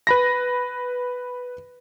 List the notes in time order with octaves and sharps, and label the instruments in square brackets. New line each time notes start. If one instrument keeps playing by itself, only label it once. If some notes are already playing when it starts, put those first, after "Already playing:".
[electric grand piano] B4 B5 A#6